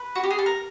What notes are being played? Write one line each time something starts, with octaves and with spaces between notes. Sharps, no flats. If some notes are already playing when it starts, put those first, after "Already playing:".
Already playing: B4
F#4
G4
G#4
A4
A#4